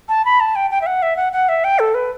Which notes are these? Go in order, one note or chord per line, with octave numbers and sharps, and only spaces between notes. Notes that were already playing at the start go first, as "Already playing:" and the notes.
A5
B5
A5
G5
G5
E5
F#5
E5
F#5
F#5
E5
G5
A4
B4